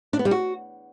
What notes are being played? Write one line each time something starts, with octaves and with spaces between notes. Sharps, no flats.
D4
B3
G3
F#4